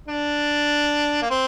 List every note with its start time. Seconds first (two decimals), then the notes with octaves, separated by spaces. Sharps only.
0.08 D4
1.22 A#3
1.30 C4